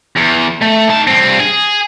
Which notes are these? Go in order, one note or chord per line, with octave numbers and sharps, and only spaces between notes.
E2
A3
D#4 A5
G2 C4
G#4